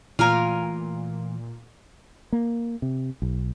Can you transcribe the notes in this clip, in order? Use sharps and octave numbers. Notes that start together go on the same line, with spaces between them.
A#2 E3 A3 F4 A#4 G#5 A#5 F6
A#3
C3
B1